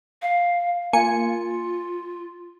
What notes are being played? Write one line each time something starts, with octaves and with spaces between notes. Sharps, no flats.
F5
A#3 F4 G#5 C#7